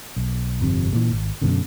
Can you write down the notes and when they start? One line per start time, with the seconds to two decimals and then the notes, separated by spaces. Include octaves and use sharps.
0.16 B1
0.61 G1 F2 C3
0.93 A#2 E3
1.10 G#1
1.42 F#2 B2 D3